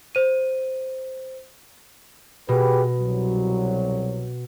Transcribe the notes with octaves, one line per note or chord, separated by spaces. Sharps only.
C5 D#7
B2 G4 G#4 B4
C2 F#3